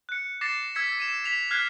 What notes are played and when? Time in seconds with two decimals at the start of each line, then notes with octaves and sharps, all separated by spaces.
0.09 F#6 C#7
0.41 D6 A6 A#6 C7 C#7 E7
0.75 E6 G#6 B6 C#7
0.98 E6 D#7 E7
1.24 B6 F7
1.51 F6 F#6 G#6 B6 C7